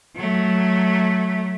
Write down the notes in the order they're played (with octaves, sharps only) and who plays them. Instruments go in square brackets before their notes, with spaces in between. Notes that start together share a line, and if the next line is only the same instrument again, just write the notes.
[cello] F#3 A3